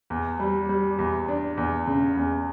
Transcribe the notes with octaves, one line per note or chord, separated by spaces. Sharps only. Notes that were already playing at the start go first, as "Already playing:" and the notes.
E2
G3
G3
E2
D4
E2
C#3
E2